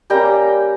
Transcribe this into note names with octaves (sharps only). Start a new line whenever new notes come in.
G3 A#3 C#4 G5 A#5